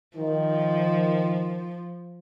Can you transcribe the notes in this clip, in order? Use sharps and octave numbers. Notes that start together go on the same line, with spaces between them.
D#3 F3